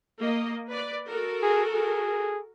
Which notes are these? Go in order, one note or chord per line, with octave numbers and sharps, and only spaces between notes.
A#3 D#5
B4 D5
F#4 A4 A#4
G#4
G#4